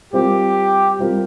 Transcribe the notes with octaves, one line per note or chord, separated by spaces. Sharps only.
G3 C4 F4 G4 A#4
G3 C4 F4 A#4